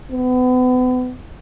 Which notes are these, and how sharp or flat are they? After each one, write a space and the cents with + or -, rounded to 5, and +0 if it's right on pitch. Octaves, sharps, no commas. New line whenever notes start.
B3 +35